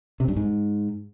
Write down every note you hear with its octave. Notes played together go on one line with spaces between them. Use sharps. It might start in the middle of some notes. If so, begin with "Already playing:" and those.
C3
G2
G#2